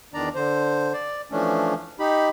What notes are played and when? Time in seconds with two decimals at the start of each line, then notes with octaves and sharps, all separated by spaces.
0.14 E2 D#3 D4 D5 A#5
0.35 D3 C5
0.94 D5
1.32 E3 F3 A3 C#4 D4
1.99 D#4 G4 B5